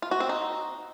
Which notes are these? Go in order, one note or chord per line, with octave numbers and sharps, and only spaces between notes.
F4
F#4
C4
D#4